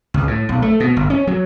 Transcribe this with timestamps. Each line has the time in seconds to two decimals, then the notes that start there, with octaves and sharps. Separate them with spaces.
0.14 C#2
0.27 A2
0.49 B1
0.62 A3
0.80 B2
0.97 G1
1.10 C#4
1.27 F#3